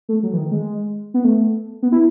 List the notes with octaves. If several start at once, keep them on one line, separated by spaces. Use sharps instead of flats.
A3
F#3
E3
D#3
G#3
B3
A3
B3
E4